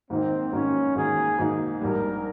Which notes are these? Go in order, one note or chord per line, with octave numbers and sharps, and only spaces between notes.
G#2 D#3 A#3 C4 D#4
G#2 D#3 A#3 C#4 D#4
G#2 D#3 A#3 D#4 G#4
G#2 D#3 A#3 D#4
A#1 G#2 G3 A#4